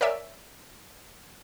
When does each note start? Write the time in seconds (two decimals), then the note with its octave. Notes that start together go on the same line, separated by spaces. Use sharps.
0.01 A#4 C#5 D5 E5 G#5